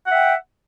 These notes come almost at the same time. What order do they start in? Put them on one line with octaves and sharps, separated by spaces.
F#5 E5 G5